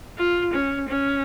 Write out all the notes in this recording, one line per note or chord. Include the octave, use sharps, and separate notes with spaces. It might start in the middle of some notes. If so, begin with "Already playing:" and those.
F4
C#4
C#4